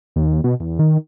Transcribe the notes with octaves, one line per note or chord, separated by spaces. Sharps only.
D#2
B2
E2
D#3